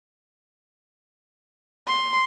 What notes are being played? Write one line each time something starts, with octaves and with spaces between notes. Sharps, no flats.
C6